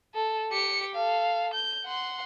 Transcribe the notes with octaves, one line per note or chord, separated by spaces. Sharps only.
A4
G4 C#7
A4 F5
G6
F#5 C6